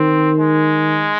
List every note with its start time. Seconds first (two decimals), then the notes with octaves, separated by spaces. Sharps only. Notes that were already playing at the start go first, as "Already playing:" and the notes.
Already playing: D#3 C4
0.38 G#3